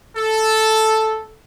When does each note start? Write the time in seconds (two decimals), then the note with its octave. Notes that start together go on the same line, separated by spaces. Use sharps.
0.16 A4